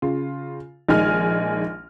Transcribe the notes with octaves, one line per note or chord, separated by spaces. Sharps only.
C#3 F4
A#1 D#3 G#3 G#5 F6